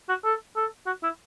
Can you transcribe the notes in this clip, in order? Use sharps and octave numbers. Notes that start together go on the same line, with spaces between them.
F#4
A4
A4
F#4
E4